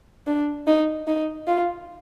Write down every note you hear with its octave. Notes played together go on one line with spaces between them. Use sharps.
D4
D#4
D#4
F4